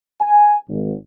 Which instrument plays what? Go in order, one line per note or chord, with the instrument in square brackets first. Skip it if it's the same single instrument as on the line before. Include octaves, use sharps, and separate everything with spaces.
[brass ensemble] G#5
G#1